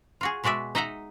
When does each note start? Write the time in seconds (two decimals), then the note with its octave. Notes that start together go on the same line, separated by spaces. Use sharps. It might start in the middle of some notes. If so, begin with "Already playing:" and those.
0.21 F4 F#4 G#4
0.44 B2 G#3 F#4 D5 E5
0.75 D#4 D#5 E5 F#5 A#5